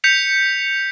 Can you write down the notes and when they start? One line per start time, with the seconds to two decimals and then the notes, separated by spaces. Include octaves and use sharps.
0.04 G6 B6 C#7 F7